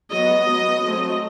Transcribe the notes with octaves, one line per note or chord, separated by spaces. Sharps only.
F#3 B3 D#5
F#3 B3
F#3 A3 C4